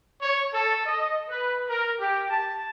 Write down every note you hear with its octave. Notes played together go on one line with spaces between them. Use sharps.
C#5
A4
D#5
B4
A#4
G4
A5